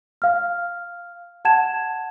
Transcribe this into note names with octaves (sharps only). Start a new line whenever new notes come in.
F5 F6
F#5 A5 G#6 E7